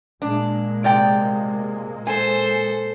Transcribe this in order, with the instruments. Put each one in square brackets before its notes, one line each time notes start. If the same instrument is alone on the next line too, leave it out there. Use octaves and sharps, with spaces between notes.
[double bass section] A#2 G#3 A#3 [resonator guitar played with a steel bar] D4
[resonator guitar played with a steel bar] C3 D5 G5
[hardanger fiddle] A4 C5 [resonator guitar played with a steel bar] G#5